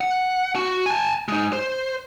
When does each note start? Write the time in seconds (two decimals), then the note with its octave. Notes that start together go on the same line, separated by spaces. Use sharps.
0.01 F#5
0.56 F#4
0.86 G#5 A5
1.28 G#3 D#4
1.53 C5